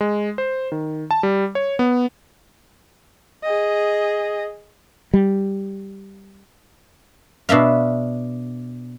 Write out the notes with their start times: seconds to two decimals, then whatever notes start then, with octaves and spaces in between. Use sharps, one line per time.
0.01 G#3
0.38 C5
0.72 D#3
1.11 A5
1.23 G3
1.55 C#5
1.79 B3
3.43 G#4 D#5
5.14 G3
7.49 B2 D4 E5 F5